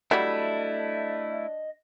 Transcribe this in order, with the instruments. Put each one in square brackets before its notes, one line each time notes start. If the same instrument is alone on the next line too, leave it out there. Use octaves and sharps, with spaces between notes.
[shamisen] F#3 G3 [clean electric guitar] A3 E4 [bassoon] D4 [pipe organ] D#5